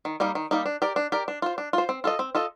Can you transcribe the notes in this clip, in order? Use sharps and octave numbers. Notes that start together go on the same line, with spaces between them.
D#3
G3 A#3 D#4
D#3
G3 A#3 D#4
D4
G4 A#4 D5
D4
G4 A#4 D5
D4
F4 C5
D4
F4 C5
C4
F4 A4 D#5
C4
F4 A4 D#5